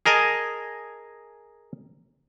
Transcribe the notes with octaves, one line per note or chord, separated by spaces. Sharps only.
G#4 A#4 D#5 G#5 A5